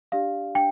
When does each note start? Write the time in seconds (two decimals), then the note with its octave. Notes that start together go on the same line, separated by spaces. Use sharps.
0.12 D4 G4 D5 F5
0.55 D4 G5